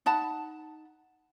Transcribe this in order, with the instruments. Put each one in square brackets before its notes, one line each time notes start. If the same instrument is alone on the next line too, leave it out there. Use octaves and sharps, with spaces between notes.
[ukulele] D#4 F#5 A5 B5